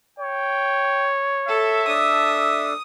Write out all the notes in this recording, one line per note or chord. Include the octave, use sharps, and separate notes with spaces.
C#5 G5
A4 E5
D4 A4 D#6